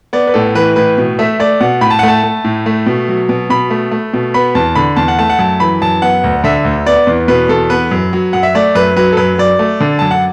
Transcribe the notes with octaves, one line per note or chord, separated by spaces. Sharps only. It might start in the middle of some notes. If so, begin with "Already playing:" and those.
B3 D5
B4
A2 A4
E3 B4
A2 B4
B2
A3 E5
A3 D5
B2 F#5
A2 B5
A5
F#5
A3 A5
A3
A2
A3
B2
F#3
B2
B2 B5
A3
A3
B2
B3 B5
E2 A5
D3 B5
E2 A5
F#5
A3 A5
F#5
F#2 A5
E3 B5
F#2 A5
B3 F#5
D2
D3 E5
D2
B3 D5
E2
B2 B4
E2 A4
B3 B4
F#2
F#3
F#2 F#5
E5
A3 D5
F#2 B4
F#3 B4
A4
F#2 B4
F#3 D5
A3
D3
F#2 A5
F#5